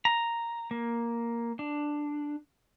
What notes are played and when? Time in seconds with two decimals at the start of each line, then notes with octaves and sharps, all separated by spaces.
0.05 A#5
0.71 A#3
1.59 D4